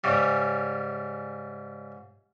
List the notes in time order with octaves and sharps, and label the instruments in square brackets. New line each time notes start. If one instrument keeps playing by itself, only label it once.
[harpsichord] G#2 C#3 G3